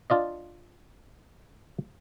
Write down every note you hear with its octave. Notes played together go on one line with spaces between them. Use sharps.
D4 F4 D5 D#5